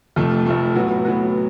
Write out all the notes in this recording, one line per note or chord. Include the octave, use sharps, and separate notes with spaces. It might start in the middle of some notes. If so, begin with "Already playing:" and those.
F1 F2 F3 A3
F1 F2 F3 A3
A2 F#3 B3 F#4
A2 F#3 B3 F#4